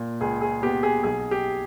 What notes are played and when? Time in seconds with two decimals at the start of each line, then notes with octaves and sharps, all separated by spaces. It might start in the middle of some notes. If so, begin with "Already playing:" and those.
Already playing: A#2
0.21 C#2 G#4
0.41 G#4
0.62 B3 G4
0.83 G#4
1.04 B1 G#4
1.31 G4